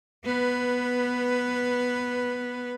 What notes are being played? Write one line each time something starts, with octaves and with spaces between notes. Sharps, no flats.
B3 B4